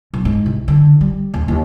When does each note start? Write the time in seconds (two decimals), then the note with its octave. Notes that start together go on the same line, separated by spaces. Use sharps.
0.14 B1
0.25 G#2
0.46 C2
0.68 D3
1.01 G3
1.34 D#1
1.48 D#2